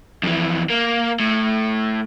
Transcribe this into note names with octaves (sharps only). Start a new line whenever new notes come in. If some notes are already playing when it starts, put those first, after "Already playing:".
F2 E3
A#3
A2